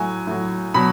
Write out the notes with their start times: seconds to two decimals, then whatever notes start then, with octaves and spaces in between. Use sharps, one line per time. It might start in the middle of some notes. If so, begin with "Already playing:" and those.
Already playing: A2 F#3 G#5
0.27 A2 F#3
0.74 B2 F#3 B5